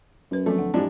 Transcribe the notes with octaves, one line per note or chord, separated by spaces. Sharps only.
F#2 F#3 B4
F3 F#3 A3 C4
D2 F#5
F2 G#2 E3 D4 G4 D5